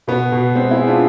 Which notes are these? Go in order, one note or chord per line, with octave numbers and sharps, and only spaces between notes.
B2 B3
B2
G#3 C4
E4 G#4
G#3
D4 F4